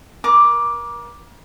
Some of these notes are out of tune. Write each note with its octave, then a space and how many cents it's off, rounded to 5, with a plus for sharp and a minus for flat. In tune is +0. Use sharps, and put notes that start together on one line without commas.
A#4 +35 D6 +0